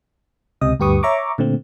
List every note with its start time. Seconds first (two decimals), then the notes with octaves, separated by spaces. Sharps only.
0.61 C#2 C3 D#5 D#6
0.80 D2 G2 G4 B4 C#6 D#6
1.03 C#5 E5 A#5 C#6 D6
1.38 A#2 D3 A3 C4